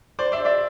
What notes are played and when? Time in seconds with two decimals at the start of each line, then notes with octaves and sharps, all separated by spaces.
0.19 C5 D5
0.32 D5 E5
0.45 D5 E5